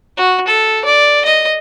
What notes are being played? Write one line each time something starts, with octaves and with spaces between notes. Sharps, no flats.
F#4
A4
D5
D#5